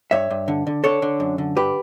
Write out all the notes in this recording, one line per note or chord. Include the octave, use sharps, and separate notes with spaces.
G2 C#5 E5
G2
D3
D3
D3 A4 C#5
D3
F#2
D3
G2 G4 B4